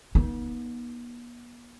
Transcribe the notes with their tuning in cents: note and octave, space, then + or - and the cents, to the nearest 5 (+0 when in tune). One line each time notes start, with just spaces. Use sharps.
B3 -45 D#4 +0